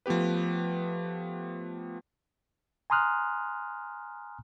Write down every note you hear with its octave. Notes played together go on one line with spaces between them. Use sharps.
F3 A3 B3 G4 B4
G#5 A#5 C6 D#6 F6 F#6